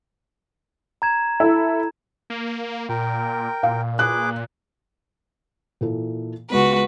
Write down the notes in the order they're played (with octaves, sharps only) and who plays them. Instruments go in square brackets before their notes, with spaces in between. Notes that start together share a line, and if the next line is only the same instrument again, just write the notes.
[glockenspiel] A#5 G#6 E7
[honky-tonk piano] E4 A4
[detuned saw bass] A#3
[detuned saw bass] A#2 [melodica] A#4 G5
[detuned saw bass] A#2 [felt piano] F5
[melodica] G#4 B4 D6 [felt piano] F#6
[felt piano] A#2 E3 A4
[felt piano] C#2 B3 [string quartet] G#3 F#4 [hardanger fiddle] B4